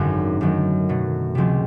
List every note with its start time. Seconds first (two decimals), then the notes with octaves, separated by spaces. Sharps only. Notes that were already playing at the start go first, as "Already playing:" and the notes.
Already playing: G#1 F#2 D3 C4
0.41 F#2 D#3 F#3 A3
0.89 B2 F#3 A3
1.35 C#2 C3 F3 G#3 C4